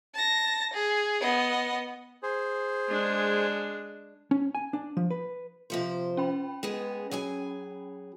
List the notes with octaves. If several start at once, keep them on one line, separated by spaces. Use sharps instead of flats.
A5 A#6
G#4
B3 D#5
G#4 C5
G#3 D4
C#4
G#5
D4
F3
B4
C3 F3 C5
C#4 G5 B5
G#3 B3 G#4
F#3 G#4 G#5